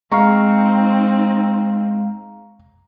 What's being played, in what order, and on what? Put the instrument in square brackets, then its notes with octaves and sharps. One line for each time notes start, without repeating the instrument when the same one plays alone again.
[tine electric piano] G#3 F5 [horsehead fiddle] C4 D#4 [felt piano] A#5 C#6